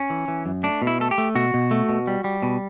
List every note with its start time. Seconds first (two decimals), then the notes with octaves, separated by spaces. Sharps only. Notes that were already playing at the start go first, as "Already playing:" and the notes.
Already playing: C#4
0.10 E3
0.28 E3
0.46 F#2
0.63 A3 D4
0.82 B2
0.87 E4
1.00 A3 A4
1.11 G4
1.18 A3
1.35 B2 F#4
1.54 B2
1.71 A3
1.89 B2
2.07 G3
2.24 G3
2.43 B2